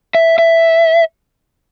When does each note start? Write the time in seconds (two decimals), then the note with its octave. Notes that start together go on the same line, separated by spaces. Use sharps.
0.15 E5
0.38 E5